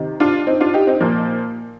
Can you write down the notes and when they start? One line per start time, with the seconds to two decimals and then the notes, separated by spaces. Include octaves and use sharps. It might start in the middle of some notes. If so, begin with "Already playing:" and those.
Already playing: C3 D#3
0.20 D4 F4
0.47 C4 D#4
0.60 D4 F4
0.74 D#4 G4
0.87 C4 D#4
1.01 A#2 F3 A#3